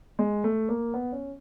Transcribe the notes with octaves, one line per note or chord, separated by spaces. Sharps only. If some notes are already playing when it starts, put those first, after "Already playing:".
G#3
A3
A#3
B3
C#4